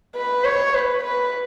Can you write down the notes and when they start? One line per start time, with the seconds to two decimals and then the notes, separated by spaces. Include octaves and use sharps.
0.16 B4
0.45 C#5
0.75 B4
1.04 B4